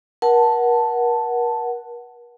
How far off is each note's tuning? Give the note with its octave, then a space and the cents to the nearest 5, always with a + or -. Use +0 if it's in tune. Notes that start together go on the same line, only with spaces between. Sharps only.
A#4 +40 F#5 +0 A5 +0